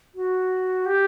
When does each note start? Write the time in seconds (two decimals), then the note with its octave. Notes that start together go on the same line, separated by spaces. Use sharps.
0.15 F#4
0.86 G4